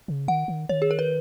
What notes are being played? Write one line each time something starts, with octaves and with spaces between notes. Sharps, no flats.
C#3
D#3 F#5
D#3
D#3 C#5
G#4
A#4
B4